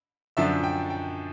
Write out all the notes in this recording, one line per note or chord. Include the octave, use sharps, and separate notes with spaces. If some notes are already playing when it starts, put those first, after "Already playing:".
F#2 D3 F3 E5
G5
G5